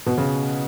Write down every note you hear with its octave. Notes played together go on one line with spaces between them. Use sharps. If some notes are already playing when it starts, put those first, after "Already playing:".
B2
C#3